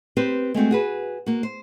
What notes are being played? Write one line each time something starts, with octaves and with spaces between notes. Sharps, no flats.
C4 G4 B4 C5
G#3 A3 C4 F#4
F#4 G#4 B4
A#3 F#4
C5